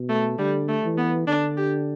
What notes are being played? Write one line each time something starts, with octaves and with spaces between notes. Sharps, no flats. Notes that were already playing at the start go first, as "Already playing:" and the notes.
Already playing: B2
A3
D3 G3
A3
E3
B3
D3 D4
G4